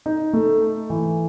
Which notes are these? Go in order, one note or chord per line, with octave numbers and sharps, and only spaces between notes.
D#4
A3
A4
E3